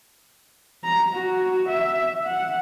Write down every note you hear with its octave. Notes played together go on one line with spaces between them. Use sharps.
A#5
F#4
E5
F#5